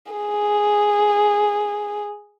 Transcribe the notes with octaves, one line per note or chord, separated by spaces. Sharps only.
G#4